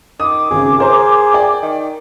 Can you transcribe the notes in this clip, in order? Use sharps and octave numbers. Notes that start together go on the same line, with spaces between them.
D#3 D6 D#6
G#1 C#3 G#4
G#4 A#4 C5 A#5
D5 G5
D#3